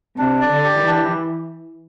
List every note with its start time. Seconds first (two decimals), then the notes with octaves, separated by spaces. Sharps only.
0.18 C3 D4
0.41 D5
0.48 D3
0.64 G4
0.79 E3
0.87 D4